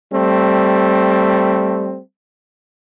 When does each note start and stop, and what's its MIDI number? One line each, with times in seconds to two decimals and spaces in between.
0.13 1.99 55
0.13 1.99 57
0.13 1.99 60